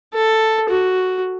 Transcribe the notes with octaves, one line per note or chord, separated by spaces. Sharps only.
A4
F#4